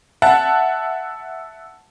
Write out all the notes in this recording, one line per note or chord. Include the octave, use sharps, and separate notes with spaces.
E5 F#5 A5